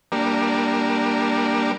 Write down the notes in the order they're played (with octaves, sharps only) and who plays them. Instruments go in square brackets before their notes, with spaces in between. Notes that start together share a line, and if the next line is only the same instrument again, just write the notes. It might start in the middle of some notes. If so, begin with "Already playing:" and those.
[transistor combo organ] G3 A#3 D4 A#4